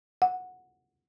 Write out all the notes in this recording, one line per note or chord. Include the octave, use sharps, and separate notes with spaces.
F#5